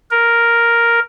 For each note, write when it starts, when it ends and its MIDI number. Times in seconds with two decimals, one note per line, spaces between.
0.11 0.99 70